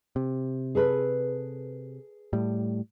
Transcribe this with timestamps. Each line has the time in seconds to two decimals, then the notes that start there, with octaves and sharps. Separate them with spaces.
0.16 C3
0.75 G#4 A4 B4
2.33 A2 G3